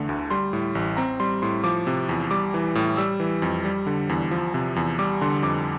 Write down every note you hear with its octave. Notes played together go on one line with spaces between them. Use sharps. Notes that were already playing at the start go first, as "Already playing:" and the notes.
Already playing: E2 D3 A3
D2
G3 C6
A2
A1
C4 A#5
G3 C6
A2 C6
F3 D6
C3
E2
G3 D6
E3
A2
G3 E6
E3
F2
G3
D3
E2
F3
C3
E2
G3 D6
D3 C6
F2 D6